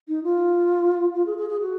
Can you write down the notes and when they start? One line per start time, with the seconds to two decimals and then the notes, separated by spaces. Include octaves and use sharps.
0.08 D#4
0.24 F4
1.15 F4
1.26 G#4
1.38 G#4
1.49 G#4
1.61 F#4